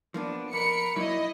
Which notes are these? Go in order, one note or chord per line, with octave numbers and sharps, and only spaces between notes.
F3 A#3 B3 D4
F2 A#4 B5 C#7
A#2 F#3 D#4 E4 D#5